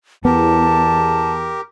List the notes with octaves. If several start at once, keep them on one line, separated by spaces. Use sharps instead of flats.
E2 B3 G4 A#4 A5